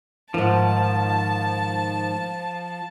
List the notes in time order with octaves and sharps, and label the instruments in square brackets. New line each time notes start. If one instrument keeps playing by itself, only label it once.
[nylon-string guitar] G#2 D#3 [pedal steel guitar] F3 [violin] A5